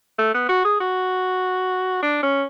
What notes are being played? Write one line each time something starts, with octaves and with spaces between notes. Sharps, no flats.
A3
B3
F#4
G#4
F#4
D4
C#4